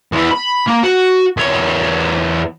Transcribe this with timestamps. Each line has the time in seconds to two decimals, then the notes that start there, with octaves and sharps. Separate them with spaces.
0.12 E2 E3
0.31 B5
0.67 A#3
0.83 F#4
1.37 E2 C#5